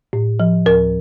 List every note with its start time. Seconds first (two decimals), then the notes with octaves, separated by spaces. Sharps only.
0.13 A2
0.40 F3
0.66 D2 A#4